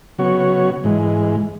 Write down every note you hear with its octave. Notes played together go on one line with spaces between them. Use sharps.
C#3 F#3 B3 F#4 C#5
G#2 E3 G#3